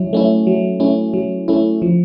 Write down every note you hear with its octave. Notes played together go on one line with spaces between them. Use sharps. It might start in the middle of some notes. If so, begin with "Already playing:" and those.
Already playing: F#3 C#4 E4
A3 C#4 E4
F#3
A3 C#4 E4
F#3
A3 C#4 E4
F3